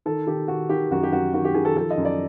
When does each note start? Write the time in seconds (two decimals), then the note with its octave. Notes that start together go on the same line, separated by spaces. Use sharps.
0.06 D#3 A4
0.27 D#3 G4
0.48 D#3 F#4
0.69 D#3 G4
0.91 F#2 F#4
1.03 G4
1.12 F#2 F#4
1.34 D#3 F#4
1.45 G4
1.54 D#3 G#4
1.65 A4
1.76 F3 A4
1.91 D#5
1.97 F#2
2.05 D5